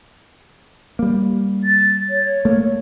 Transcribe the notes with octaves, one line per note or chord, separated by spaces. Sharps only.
G3 A#3
A6
C#5
A3 A#3